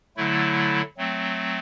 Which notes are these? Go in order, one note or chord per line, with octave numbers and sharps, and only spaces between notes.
D3 F#3 A3 E4
F#3 A3 C4